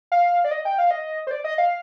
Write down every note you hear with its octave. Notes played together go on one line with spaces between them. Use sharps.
F5
D5
D#5
G5
F5
D#5
C5
D5
D#5
F5